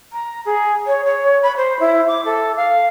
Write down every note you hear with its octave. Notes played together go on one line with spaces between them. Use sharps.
A#5
G#4
C#5
C#5
B5
C5
E4
D6
A4
F5